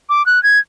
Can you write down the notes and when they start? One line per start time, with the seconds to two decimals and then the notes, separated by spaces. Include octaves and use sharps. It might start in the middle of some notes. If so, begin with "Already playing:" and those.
0.09 D6
0.26 F#6
0.43 G#6